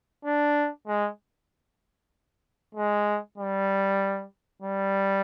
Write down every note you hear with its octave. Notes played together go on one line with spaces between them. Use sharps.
D4
G#3
G#3
G3
G3